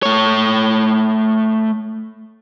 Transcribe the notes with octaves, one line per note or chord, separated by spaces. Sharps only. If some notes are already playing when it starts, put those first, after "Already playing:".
A3 C#5